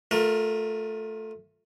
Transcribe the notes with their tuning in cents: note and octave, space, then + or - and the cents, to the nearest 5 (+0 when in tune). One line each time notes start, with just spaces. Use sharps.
A3 +0 F4 +30 A#4 +0